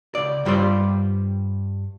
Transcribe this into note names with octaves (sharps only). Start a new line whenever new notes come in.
C#2 D5
G2 G3 F4 G4 C5 D5